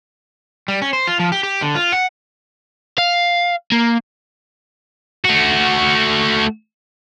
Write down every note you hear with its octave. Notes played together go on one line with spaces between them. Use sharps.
G3
C#4
C5
F4
F3
G4
G4
D3
F4
F#5
F5
A#3
A3 F#4